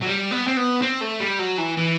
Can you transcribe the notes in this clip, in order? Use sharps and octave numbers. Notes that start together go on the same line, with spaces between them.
F#3
G3
B3
C4
B3
C4
A3
G3
F#3
E3
E3